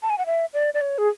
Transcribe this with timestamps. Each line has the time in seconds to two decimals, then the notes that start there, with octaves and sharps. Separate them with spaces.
0.03 A5
0.10 G#5
0.18 F#5
0.26 E5
0.54 D5
0.74 D5
0.81 C#5
0.98 G#4